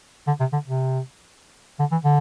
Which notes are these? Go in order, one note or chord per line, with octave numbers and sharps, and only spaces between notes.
D3
C3
D3
C3
D3
E3
D3